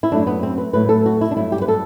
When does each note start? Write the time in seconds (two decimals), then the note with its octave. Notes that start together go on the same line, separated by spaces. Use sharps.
0.03 E4
0.11 F#2 F#3 A3 D4
0.27 B3
0.43 C4
0.58 B4
0.73 A2 F#3 A3 B4
0.89 A4
1.06 F#4
1.21 E4
1.31 D4
1.36 G2 F#3 A3 E4
1.52 G4
1.62 B4
1.68 A4